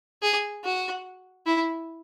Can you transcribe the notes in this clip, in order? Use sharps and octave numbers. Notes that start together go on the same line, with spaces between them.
G#4
F#4
E4